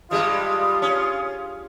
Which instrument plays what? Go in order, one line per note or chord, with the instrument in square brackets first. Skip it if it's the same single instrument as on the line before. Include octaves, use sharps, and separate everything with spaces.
[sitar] G2 G3 G#3 [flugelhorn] F4 [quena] D#6
[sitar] C#4